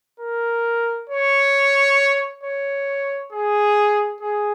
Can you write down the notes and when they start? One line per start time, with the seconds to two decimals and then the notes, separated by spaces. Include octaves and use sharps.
0.20 A#4
1.09 C#5
2.43 C#5
3.32 G#4
4.21 G#4